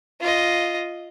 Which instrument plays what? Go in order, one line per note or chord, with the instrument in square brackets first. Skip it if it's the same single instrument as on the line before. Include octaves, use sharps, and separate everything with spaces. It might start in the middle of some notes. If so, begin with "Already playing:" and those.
[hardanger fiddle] F4 D#5